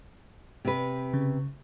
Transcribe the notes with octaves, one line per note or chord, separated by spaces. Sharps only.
C3 B4
C#3